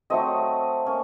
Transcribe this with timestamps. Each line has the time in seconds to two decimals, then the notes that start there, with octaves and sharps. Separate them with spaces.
0.10 F#3 A3 C4 D#5
0.86 A#3 C#4